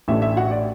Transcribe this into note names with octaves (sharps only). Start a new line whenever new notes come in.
A1 A2 A3 D4 E5
E5
F#4 F#5
D5